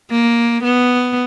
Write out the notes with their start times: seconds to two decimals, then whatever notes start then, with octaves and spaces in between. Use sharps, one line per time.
0.10 A#3
0.63 B3